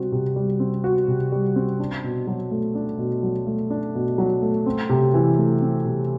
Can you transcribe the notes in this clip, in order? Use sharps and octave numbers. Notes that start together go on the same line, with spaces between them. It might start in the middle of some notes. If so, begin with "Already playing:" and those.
Already playing: C3 G3 C4 F#4
C3
G3
C4
F#4
C3
G3
C4
D4
B2
F#3
A3
D4
B2
F#3
A3
D4
B2
F#3
A3
C4
C3
E3
A3
C4
C3